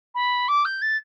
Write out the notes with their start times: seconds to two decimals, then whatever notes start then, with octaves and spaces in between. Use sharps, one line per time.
0.14 B5
0.48 D6
0.65 G6
0.81 A6